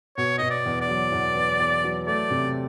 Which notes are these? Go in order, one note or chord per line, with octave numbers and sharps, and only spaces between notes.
B2 C#5
B2 D#5
D5
E2
D5
F#3
E2
E2
E2
F#3
A3 D5
C3